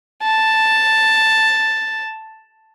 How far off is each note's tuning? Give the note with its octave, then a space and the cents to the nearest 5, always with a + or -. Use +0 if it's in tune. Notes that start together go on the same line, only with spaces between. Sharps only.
A5 +5